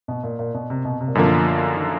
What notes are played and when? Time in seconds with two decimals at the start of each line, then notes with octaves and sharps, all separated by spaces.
0.08 B2
0.24 A#2
0.39 A#2
0.54 B2
0.70 C3
0.85 B2
1.01 C3
1.08 A#2
1.15 F#2 B2 D3 F3 A#3
1.77 D#3